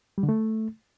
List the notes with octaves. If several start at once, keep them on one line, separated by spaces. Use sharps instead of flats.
G3
D3
A3